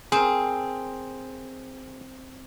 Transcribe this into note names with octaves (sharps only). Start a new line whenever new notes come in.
C4 G#4 A#4